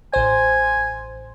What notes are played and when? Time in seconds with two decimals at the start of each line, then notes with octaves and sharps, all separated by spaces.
0.13 A1 C5 G#5